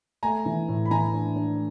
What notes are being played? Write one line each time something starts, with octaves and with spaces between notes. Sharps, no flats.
A3 G#5 A#5
E3
A2
B5
E3 G#5 A#5
D4
D4